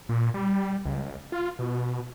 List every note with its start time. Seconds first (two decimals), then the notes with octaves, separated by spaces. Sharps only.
0.09 A#2
0.34 G3
0.85 C#2
1.32 F4
1.59 B2